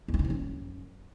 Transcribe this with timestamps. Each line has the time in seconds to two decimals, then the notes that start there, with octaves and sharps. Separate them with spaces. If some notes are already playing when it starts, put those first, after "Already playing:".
0.08 E2
0.14 F3
0.19 D#3
0.25 F3
0.30 F#2